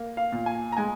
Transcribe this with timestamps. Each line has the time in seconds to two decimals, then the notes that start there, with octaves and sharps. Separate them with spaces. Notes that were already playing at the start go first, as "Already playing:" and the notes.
Already playing: A#3
0.17 F5
0.32 A#2
0.46 G#5
0.72 A#5
0.77 G#3 G#5